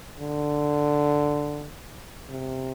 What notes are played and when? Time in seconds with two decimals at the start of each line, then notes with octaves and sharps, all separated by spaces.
0.19 D3
2.30 C3